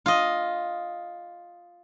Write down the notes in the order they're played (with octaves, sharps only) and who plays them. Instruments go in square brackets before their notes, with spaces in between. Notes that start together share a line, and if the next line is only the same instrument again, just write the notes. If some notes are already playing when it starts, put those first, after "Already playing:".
[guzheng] F4 D#5